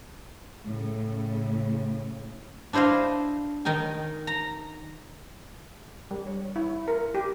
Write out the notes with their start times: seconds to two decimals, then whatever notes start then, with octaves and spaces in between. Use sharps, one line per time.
0.65 A2 C#3
2.73 D4 E4 C5 D#5 F5
3.65 D#3 D#4 G5 G#5
4.27 A#5
6.11 G3
6.27 C#5
6.56 E4
6.88 A#4
7.15 G4